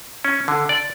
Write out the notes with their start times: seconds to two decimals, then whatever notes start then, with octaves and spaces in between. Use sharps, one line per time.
0.25 C#4
0.48 D3
0.69 D5